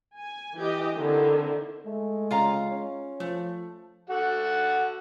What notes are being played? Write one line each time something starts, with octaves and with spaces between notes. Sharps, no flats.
G#5
E3 G4 D#5
D3 D#3 C4 E4
G#3 A3
C#3 F4 F5 A#5
C#4
F3 A3
F#4 A4 F#5